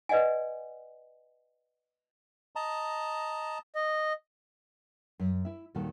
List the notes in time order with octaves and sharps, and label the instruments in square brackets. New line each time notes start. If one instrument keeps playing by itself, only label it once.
[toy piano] B4 D5 D#5 F#5 G#5
[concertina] D#5 A5 A#5
[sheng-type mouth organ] D#5
[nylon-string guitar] F#2
E4 E5
D#2 A#2 D#3 G3 F#4 A4